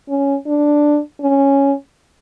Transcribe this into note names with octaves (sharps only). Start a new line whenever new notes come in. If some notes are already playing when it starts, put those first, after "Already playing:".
C#4
D4
C#4